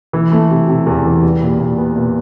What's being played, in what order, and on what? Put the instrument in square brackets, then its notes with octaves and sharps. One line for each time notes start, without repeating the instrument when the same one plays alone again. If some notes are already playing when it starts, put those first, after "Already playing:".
[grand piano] E3
A3
C3
C3
E2
E3
G3
A#2
A#2
B3
A#2